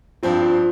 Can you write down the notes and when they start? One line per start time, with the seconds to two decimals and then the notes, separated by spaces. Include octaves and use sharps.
0.23 G2 F3 C4 F4
0.42 F4